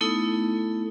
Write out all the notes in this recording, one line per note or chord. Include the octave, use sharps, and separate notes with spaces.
A3 B3 D#4 E4 A4